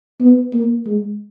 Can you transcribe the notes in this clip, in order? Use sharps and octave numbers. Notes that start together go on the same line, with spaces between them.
B3
A#3
G#3